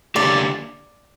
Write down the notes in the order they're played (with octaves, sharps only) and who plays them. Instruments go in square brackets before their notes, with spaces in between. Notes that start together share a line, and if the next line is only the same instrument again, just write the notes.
[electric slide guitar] D3 A#3 G4 [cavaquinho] D5